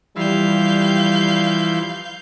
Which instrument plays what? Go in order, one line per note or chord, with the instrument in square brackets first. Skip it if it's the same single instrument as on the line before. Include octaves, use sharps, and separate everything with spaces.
[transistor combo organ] E3 F3 E4 [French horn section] G3 [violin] F5 G6